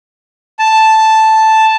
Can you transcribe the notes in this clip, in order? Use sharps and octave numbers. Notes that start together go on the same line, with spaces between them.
A5